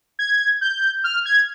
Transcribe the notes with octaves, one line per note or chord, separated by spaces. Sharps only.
G#6
G6
F6
G#6